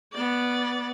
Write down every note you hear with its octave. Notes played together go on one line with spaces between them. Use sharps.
B3 D5